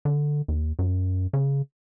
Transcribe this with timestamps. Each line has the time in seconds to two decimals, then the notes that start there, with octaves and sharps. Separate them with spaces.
0.05 D3
0.48 D#2
0.79 F#2
1.33 C#3